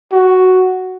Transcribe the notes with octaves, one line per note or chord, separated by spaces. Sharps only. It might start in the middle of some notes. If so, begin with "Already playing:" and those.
F#4